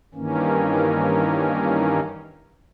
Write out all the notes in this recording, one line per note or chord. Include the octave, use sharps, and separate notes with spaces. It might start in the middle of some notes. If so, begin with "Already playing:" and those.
G2 D#3 E3 A#3 C#4